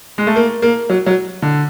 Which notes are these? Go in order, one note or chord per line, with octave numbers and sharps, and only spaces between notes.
G#3
A3
A#3
A#3
F#3
F#3
D3